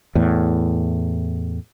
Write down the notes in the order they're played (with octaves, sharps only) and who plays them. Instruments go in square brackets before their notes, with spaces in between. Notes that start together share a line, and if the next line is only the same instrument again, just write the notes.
[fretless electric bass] E2 A2